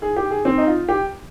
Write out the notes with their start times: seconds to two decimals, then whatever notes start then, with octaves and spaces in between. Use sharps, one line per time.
0.02 G#4
0.16 G4
0.31 G#4
0.45 C4
0.58 D#4
0.67 F4
0.88 G4